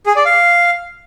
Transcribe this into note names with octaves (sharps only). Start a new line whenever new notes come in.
G#4
D5
F5